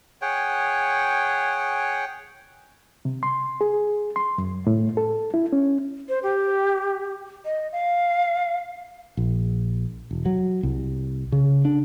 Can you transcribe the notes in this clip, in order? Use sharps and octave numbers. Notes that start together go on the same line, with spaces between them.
G#4 C#5 F#5 G5
C3
C6
G#4
C6
F#2
A2
A4
E4
C#4
C5
G4
D#5
F5
A#1
E1
F#3
C2
C#3
D4